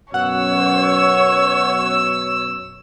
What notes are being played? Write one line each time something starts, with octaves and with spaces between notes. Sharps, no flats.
F#2 B2 C#5 F#5 E6